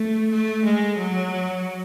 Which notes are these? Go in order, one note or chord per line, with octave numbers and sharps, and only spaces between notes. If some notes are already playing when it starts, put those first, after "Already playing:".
Already playing: A3
A3
G#3
F#3